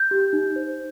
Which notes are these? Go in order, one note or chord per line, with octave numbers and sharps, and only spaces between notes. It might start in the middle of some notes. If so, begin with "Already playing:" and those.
Already playing: G6
G4
D#4
C5